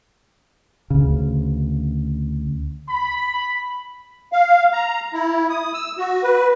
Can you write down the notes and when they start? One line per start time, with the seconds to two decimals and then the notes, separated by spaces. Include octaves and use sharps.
0.90 D2 C#3
2.89 B5
4.33 F5
4.73 A#5
5.13 E4
5.50 D#6
5.74 E6
5.98 F#4
6.23 B4